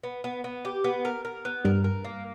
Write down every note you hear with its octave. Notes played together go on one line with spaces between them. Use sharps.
B3
B3
B3
G4
B3
A#4
A#4
B3
G2 G3 A#4
A#4
A#3